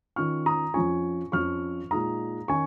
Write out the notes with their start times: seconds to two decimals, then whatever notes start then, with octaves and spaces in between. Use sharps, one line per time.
0.16 D#3 C#4 F4 C#6 F6
0.46 A#5 D#6
0.74 F2 F3 C#4 F4 G#5 C#6
1.32 F2 F3 C#4 F4 C#6 F6
1.91 A#2 G#3 D#4 A#5 D#6
2.48 D#3 C#4 G#5 C#6